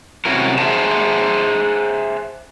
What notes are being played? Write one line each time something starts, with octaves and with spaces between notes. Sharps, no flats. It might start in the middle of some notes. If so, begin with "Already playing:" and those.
C3 C#4 E4 F#4 A#4
G#4 C5 E5 F#5 A5 A#5